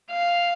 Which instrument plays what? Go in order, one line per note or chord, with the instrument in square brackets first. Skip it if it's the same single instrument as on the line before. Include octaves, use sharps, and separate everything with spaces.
[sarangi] F5